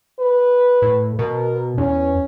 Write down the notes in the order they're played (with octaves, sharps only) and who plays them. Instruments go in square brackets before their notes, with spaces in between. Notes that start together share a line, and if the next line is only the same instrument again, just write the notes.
[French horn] B4
[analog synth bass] A2
[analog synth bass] B2 [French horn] A#4
[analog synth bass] E2 [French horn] C#4